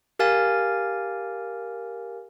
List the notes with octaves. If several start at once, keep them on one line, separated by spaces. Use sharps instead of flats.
G4 A#4 F5 G#5 A6